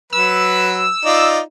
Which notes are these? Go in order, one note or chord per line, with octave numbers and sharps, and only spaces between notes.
F#3 B4 E6
D#4 F4 D5